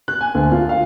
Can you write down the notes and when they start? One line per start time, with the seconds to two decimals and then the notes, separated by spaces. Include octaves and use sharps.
0.08 F#6
0.21 G#5
0.35 D2
0.52 F4
0.69 F5